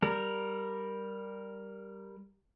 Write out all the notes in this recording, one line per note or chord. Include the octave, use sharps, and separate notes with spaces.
G3 A#4